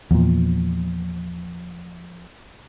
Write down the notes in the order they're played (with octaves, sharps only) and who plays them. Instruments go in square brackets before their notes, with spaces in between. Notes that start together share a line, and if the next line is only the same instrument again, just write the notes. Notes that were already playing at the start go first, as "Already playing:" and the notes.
[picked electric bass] E2 A#2 [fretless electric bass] F3